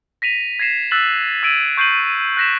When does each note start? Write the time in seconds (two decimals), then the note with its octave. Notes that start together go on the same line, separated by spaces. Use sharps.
0.22 A#6 B6 D#7 F7
0.59 G#6 A#6 C7 E7
0.91 E6 F#6 A6 B6 F#7
1.43 E6 G#6 D7 D#7 F#7
1.77 C#6 G6 C7 D#7 F#7
2.37 F#6 G#6 A#6 B6 E7